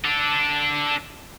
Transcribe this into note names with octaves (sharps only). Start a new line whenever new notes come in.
D4 A4